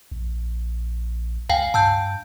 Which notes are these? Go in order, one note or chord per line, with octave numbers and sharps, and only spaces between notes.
A#1
C#2 F5 G5 G#5
G2 A5 E6 G6